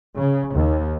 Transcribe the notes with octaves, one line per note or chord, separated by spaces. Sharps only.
C#3
D#2